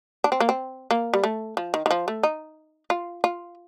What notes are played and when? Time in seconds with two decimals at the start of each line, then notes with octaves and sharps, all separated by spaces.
0.24 D4
0.32 C4
0.40 A#3
0.49 C4
0.91 A#3
1.14 G3
1.24 A3
1.57 F3
1.74 D#3
1.86 D#3
1.91 F3
2.08 A3
2.23 D#4
2.90 F4
3.24 F4